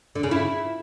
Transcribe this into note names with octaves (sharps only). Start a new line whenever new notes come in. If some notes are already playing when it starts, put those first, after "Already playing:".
D3
C#3
E4